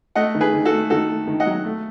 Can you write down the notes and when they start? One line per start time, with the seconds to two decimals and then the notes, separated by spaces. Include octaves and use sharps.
0.15 A3 D#5 F#5
0.35 D#3
0.41 G#4 B4
0.53 D#3
0.65 F#4 A4
0.72 A3
0.90 D#3 F#4 A4
1.09 A3
1.27 D#3
1.40 D#5 F#5
1.46 F#3
1.65 A3